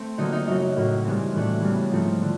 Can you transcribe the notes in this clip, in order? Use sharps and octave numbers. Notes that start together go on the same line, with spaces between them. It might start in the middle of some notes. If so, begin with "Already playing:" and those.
Already playing: A3 C4
D3 F#3 A#3 D#4
D#4
F#2 C#3 F#3 D#4
A2 F#3 A#3 C#4
G2 E3 G#3 C4
A2 E3 A3 D4
C#3 E3 G3 B3
G#2 F3 A3 C4
D3